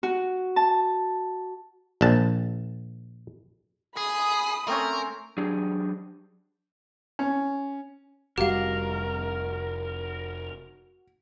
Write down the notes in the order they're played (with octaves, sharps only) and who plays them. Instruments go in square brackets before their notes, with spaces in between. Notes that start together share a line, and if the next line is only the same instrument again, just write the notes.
[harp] F#4
A5
[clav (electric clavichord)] A#1 A5
[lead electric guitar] G#4 [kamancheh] B5 D#6
[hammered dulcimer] A3 C4 C#4 [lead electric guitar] A#4
[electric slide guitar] F#3 D4 G4 G#4
[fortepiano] C#4
[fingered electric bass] F1 G3 [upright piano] F#4 [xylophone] G4 F5 [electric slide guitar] A#4